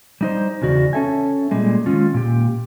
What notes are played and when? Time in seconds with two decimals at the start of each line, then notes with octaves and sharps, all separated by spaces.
0.21 G3 D#4 C5
0.62 E2 C#3 F#4 D5
0.93 C#4 A4 E5 G#5
1.51 A#2 G3 G#3
1.86 D#3 G#3 C#4 F4
2.14 A#2 G4